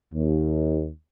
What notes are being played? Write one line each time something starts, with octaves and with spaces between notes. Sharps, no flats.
D#2